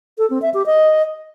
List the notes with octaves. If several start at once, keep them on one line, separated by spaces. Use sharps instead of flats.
A4
C4
E5
G4
D#5